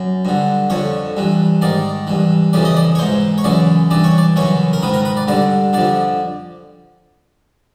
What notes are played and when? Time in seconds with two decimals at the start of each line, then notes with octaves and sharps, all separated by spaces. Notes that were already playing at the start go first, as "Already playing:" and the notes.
Already playing: F#2
0.25 G2 D3
0.70 F2 D3 C#5
1.17 G2 E3
1.62 G#2 D#3 D5
2.07 G2 E3
2.53 F2 C#3 E3 D5
2.65 D#5
2.77 D5
2.95 C#5
2.99 G#2 E3 C5
3.38 C#5
3.44 F#2 C#3 E3 D5
3.91 G2 E3 D5
4.04 C#5
4.18 D5
4.36 F#2 C#3 E3 C#5
4.73 A#4
4.83 G#2 D#3 B4
4.94 A#4
5.05 B4
5.17 D5
5.28 G2 D3 D5
5.73 F2 D3 D5